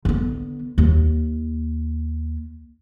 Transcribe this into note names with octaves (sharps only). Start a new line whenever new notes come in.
D3 B3
D#2